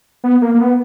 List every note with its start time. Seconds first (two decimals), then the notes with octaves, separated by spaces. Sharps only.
0.24 B3
0.42 A#3
0.54 A#3
0.61 B3